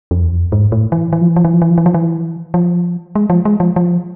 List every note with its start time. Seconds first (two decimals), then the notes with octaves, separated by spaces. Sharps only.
0.11 F2
0.23 E2
0.31 F2
0.52 G#2
0.72 A2
0.92 E3
1.13 E3
1.21 F3
1.29 E3
1.36 F3
1.45 E3
1.53 F3
1.62 E3
1.70 F3
1.78 E3
1.86 F3
1.94 E3
2.54 F3
3.15 G#3
3.30 F3
3.45 G#3
3.60 F3
3.76 F3